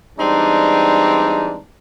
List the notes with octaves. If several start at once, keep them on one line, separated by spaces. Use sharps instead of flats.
E3 G3 G#3 C4 D4 D#4